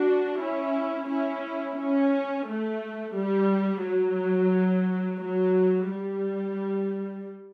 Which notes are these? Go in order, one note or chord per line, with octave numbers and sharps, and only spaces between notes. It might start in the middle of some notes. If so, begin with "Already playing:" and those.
Already playing: D4 F#4
C#4 E4
C#4 E4
C#4
A3
G3
F#3
F#3
G3